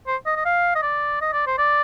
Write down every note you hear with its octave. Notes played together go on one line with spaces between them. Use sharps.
C5
D#5
D#5
F5
D#5
D5
D#5
D5
C5
D5